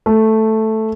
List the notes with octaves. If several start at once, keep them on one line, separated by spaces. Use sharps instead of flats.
A3